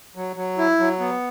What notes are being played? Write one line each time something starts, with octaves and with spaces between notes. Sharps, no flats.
F#3
F#3
E4
F#3
B3